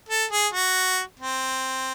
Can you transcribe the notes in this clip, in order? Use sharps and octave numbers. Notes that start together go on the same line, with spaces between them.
A4
G#4
F#4
C4